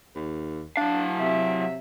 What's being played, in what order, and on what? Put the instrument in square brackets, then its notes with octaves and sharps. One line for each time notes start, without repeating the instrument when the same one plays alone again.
[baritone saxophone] D#2
[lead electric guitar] F#3 F5 [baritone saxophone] D4
[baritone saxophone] C3 [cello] E5